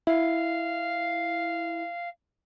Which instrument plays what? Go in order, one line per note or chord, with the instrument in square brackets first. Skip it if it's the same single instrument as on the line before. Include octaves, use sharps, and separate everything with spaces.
[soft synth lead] E4 [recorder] F5